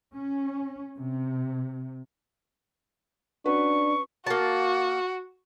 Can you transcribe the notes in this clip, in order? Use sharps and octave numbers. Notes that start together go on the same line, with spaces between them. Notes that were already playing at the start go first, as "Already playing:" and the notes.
C#4
C3
C#4 D4 F#4 B4 C#6
A#3 F#4 A5